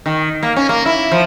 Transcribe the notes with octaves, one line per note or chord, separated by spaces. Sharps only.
D#3
A#3
C#4
A#3
E4
F3